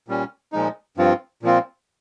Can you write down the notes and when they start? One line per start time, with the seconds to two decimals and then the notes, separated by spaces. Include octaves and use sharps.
0.08 A#2 G3 C#4
0.52 A#2 F3 G#3 D#4
0.97 G2 F3 C4 F4
1.43 A#2 F3 C4 F4